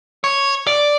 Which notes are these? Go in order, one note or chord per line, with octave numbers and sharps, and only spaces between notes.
C#5
D5